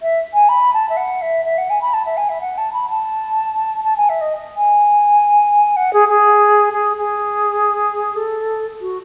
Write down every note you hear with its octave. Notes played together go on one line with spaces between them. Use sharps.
E5
G#5
B5
A5
E5
F#5
E5
E5
F#5
G#5
B5
A5
E5
G#5
E5
F#5
A5
B5
A5
A5
G#5
E5
D#5
G#5
F#5
G#4
G#4
G#4
G#4
A4
F#4